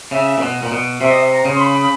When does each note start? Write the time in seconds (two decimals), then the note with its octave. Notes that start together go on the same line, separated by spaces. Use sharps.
0.11 C#3 E5
0.38 A#2
0.42 B2
0.62 A#2
0.71 B2
1.00 C3 E5
1.10 D#5
1.19 E5
1.30 A#5
1.45 C#3
1.56 C6
1.60 B5